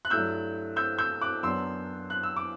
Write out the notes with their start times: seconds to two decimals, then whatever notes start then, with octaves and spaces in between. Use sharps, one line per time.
0.05 F#6
0.10 G2 F#3 A3 E4 E6 G6
0.76 E6 G6
0.98 E6 G6
1.21 D6 F#6
1.43 F#2 F#3 B3 D4 C6 E6
2.10 F#6
2.23 E6
2.36 D6